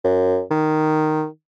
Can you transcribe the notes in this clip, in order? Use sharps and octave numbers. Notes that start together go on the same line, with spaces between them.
F#2
D#3